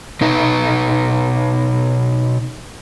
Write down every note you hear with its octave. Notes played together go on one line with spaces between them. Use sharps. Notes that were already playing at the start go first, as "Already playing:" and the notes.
B2 D#4 B4